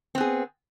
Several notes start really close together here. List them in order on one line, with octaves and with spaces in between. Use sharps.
C4 B3 G#4